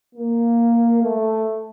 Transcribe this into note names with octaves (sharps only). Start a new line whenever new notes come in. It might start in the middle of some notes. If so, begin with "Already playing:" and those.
A#3
A3